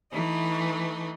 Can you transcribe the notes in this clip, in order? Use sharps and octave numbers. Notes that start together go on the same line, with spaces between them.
E3 A3 D#4